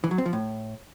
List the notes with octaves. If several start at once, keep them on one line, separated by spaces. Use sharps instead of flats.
E3
F#3
C4
F3
A2